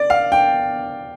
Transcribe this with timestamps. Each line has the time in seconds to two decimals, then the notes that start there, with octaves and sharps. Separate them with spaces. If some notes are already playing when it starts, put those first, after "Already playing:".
Already playing: D5
0.10 F5
0.32 G5